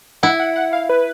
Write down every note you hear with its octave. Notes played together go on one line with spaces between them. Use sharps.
E4 F#5
F#5
F#5
F5
B4